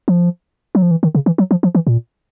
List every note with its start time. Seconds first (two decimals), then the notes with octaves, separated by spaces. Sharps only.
0.08 F3
0.75 F#3
0.82 F3
0.91 E3
1.03 D#3
1.15 C#3
1.26 E3
1.38 F#3
1.51 F3
1.63 F3
1.75 E3
1.87 A#2